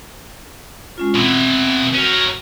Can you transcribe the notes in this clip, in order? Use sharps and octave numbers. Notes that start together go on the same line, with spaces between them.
G#3 C#4 F4
B2 E3 C4
C#4 F#4 A#4